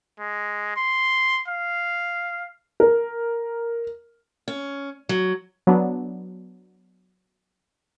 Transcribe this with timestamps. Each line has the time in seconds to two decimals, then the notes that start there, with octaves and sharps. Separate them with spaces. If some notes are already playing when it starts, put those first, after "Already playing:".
0.20 G#3
0.76 C6
1.48 F5
2.80 A#4
4.48 C#4
5.09 F#3
5.67 F#3 B3 D4